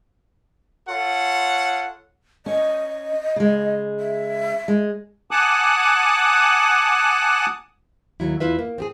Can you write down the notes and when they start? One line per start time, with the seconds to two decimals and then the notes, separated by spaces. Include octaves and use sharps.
0.89 F4 A4 C#5 F#5
2.46 C#4 D#5
3.36 C#3 G#3
4.00 E5
4.68 G#3
5.31 F#5 G#5 A5 D6 D#6 F#6
8.20 D#2 F#3 E4
8.40 E2 E4 F4 B4 E5
8.59 A#3
8.78 C4 G4 G#4